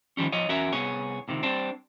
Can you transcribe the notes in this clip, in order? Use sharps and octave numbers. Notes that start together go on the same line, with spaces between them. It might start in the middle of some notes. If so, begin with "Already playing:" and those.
D#3 F3 G3 C#4
F3 C#5 D#5
E2 C#4 F#4 A#4 E5
C2 B3 G#4 C#5
C#2 C3 D#3
G3 C4 D4